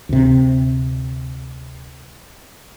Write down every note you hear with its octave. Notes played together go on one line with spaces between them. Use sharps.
D2 C3